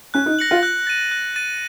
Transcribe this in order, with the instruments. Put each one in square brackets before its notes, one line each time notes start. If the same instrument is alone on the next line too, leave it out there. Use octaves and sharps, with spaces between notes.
[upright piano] C#4 [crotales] F#6
[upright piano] D#4
[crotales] A#6 C#7 F#7
[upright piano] F4
[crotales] F#6
A6 D#7
F#6
A6 D#7